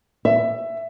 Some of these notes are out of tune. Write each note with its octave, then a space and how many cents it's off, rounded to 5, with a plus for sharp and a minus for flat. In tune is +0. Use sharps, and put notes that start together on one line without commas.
E5 +20